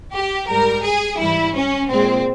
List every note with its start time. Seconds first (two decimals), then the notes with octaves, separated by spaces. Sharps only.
0.14 G4
0.49 G#2 G3 A#4
0.84 G#4
1.20 G#2 E3 G3 E4
1.55 C#4
1.90 A#2 G#3 C4